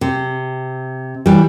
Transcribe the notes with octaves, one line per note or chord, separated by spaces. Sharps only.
C3
E3 G3